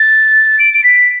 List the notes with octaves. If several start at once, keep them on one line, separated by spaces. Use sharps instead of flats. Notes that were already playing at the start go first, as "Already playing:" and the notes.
Already playing: A6
D7
D7
B6